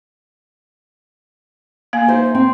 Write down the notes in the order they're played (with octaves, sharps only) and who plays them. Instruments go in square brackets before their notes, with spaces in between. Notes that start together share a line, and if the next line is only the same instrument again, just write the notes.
[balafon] A#3 F5 G#5
[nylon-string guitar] D#4 C5 E5
C4